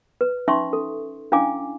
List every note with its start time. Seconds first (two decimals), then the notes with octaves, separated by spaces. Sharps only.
0.21 B4
0.48 C#4 D#4 E5 C6 C#6
0.73 A4
1.32 C#4 D4 E4 F5 G#5 D6